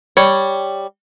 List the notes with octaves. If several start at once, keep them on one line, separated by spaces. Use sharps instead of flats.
G3 C#5